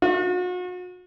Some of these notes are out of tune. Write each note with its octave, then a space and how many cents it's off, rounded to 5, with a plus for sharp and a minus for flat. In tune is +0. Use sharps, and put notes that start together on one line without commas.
F#4 -40